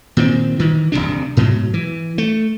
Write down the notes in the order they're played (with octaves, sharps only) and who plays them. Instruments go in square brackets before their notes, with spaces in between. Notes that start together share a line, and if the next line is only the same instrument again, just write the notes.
[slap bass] A#2 D#3 C4
D#3 E3
D1 B1 C3 D4
G#2 B2 F#3
E3
A3